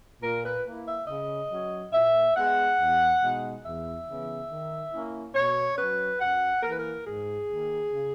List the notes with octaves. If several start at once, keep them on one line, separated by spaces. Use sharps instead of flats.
A#2 A#4
B4
A#3 E4
E5
C#3 D#5
F#3 C#4
A#2 E5
G#3 B3 F#5
E2
B2 G#3 D#4
E2 E5
C#3 E3 B3
D#3
A#3 C#4 E4
B2 C#5
F#3 C#4 B4
F#2 F#5
E3 A#3 A#4
B4
A#4
G#2 G#4
D#3 A#3
C#3